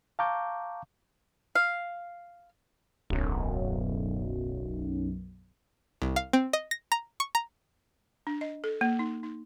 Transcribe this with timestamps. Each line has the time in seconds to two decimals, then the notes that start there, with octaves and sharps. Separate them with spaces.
0.19 F5 A5 A#5 C#6 D6 G6
1.55 F5
3.10 D1 B1 F#2
6.02 C2
6.16 F5
6.33 C4
6.53 D#5
6.71 A#6
6.92 A#5
7.20 C#6
7.35 A#5
8.27 D4
8.41 D#5
8.64 A4
8.81 A#3
8.99 D#4
9.23 D#4